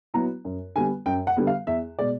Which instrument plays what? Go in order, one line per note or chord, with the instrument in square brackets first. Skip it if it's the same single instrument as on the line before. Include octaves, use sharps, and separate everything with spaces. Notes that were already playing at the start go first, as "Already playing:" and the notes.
[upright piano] F#3 B3 E4 A#5
F#2
D3 G3 B3 G#5
F#2 G5
F#5
D3 G3 B3
F5
E2 E5
B2 G#3 D5